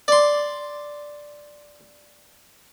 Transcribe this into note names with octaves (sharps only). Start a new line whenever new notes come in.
D5 C6